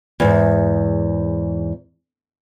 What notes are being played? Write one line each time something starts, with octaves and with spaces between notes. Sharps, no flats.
E2 G#2